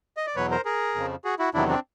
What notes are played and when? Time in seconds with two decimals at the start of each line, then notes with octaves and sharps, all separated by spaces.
0.17 D#5
0.27 D5
0.36 E2 B2 F#3 B4 C#5
0.51 A#4 C5
0.65 G#4 A#4
0.95 F2 C#3 F3
1.25 F#4 G#4
1.39 E4 F#4
1.54 E2 C3 D#3 F#3 D4 E4
1.69 C4 D4